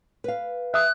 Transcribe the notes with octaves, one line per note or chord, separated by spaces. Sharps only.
B4 F5
E5 D#6 F#6